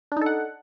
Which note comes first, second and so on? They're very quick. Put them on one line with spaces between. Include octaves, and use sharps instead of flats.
D4 D#4 A4 F#5